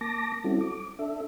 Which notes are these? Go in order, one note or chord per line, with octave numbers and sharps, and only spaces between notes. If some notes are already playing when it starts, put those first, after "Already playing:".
A#3 A5 D6 A#6
G3 C4 C#4 E4 F#4 A4
D6
D4 A4 E5